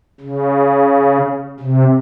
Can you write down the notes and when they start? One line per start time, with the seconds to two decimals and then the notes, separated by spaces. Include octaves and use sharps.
0.21 C#3
1.60 C3